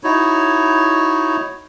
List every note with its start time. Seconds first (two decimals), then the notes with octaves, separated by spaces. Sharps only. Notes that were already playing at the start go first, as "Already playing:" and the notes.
0.04 D#4 E4 F#4 C#5